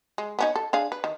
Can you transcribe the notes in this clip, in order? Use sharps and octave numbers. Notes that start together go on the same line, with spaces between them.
G#3
B3 C#4 D#4
A4
D4 G#4 F5
B4
D#3